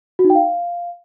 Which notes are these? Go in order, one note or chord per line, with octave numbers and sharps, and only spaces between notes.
F#4
D#4
G5
F5